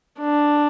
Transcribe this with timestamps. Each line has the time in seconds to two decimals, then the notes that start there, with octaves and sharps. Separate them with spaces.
0.20 D4